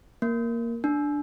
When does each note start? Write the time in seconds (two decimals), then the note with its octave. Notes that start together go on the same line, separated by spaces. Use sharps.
0.22 A#3
0.84 D4